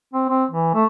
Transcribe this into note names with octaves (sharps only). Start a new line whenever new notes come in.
C4
C4
E3
A3